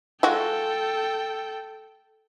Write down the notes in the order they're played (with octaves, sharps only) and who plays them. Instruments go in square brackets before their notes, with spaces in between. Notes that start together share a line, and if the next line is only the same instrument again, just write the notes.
[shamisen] G#3 F4 F#4 [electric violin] A4 G5